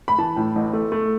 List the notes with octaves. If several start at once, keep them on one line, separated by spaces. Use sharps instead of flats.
B5
E3 A5
A2
A1
A3
A3